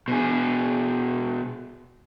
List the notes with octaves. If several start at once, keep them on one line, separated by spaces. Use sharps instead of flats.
B2 G#4